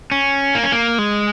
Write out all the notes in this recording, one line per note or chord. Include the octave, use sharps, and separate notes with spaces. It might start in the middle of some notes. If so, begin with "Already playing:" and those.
C#4
A#3
C#4
A#3
G#3